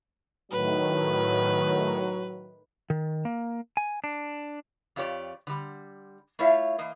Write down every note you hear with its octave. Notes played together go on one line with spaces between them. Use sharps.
A2 D#3 F#3 B4
D#3
A#3
G#5
D4
F2 F4 G4 C#5 D5
D3 G3
A3 E4 F4 C#5 E5 F5
E3 A#3 D#5